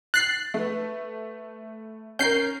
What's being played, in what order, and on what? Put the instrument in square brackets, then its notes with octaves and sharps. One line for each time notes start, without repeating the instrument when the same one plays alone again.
[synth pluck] F#6 C7 [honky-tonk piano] A6
[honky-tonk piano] A3 B3
[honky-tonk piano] C#4 A#4 [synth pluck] G6 C7